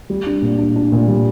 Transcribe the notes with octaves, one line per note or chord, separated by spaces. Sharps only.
G3
D4
A#2
D4
D4
A#2
G3